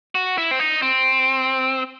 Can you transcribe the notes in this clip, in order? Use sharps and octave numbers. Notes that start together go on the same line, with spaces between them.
F#4
E4
C4
D#4
C4